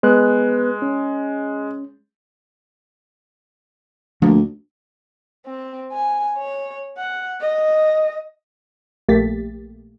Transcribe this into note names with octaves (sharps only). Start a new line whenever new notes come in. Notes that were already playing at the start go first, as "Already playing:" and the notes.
G#3 B3 B4 F#6
C#4
D2 F3 A#3
C4
G#5
C#5
F#5
D#5
A#1 A3 A#3 G4 A6 B6